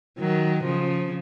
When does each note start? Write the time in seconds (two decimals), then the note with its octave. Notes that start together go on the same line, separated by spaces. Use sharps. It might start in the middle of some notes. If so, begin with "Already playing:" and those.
0.19 D#3 F#3
0.64 C#3 F3